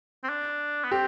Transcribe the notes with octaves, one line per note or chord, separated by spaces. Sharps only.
C4
D4
B3
C4 G4